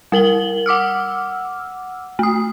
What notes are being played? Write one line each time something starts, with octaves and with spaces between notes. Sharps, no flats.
G3 A#4 F#7 G7
F#5 D6 E6 F6
A3 D#6